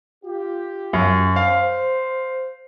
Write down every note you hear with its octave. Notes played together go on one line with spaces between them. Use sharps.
F4 G4
F#2
C5 F5